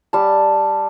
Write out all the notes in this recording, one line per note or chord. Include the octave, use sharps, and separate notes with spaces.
G3 A5